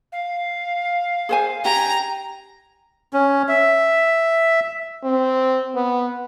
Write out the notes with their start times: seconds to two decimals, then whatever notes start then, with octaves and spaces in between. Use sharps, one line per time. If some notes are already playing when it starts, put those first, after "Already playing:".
0.12 F5
1.29 G#4 C5 G#5
1.65 G4 G5 G#5 A#5
3.13 C#4
3.49 E5
5.04 C4
5.75 B3